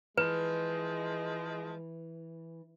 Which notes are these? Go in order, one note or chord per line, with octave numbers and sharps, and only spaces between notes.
E3 F3 G#3 B4